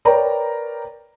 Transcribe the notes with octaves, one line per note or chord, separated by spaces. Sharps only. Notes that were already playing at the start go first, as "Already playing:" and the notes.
A#4 B4 C#5 D5 G5 A#5